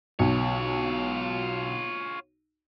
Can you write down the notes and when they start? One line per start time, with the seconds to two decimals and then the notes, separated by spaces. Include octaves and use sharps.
0.19 B1 F4 C#5